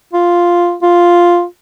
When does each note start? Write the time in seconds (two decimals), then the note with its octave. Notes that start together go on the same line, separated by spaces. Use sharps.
0.13 F4
0.82 F4